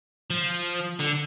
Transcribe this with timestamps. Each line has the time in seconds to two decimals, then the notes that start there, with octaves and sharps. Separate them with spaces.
0.30 F3
1.00 D3